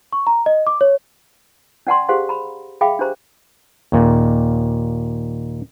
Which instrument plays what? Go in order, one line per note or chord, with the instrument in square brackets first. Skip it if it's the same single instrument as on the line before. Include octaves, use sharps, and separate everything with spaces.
[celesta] C#6
A#5
D#5
D6
C#5
[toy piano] C#4 D5 F#5 A5 A#5 C6
G4 G#4 C5 F5 F#5 C6
A#5 B5
G#4 E5 F5 G5 B5 D6
D4 G4 C5 A#5
[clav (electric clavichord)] D#2 A#2